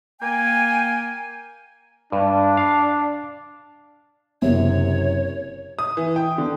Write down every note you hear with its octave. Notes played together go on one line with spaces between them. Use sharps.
A#3 G5 G#5
G2 D4
F5
F#1 F#2 C3 C#5
D#6
E3
G5
D3